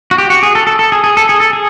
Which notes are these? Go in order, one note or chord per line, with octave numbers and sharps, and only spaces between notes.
F#4
G4
F#4
G#4
A4
A4
A4
G#4
G#4
A4
G#4
A4
G#4